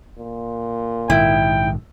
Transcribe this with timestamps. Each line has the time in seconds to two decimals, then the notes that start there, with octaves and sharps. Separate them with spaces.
0.19 A#2
1.10 A#1 G#2 D#3 E4 G5